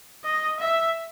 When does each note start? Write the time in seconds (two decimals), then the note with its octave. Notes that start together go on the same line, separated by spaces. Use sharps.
0.24 D#5
0.60 E5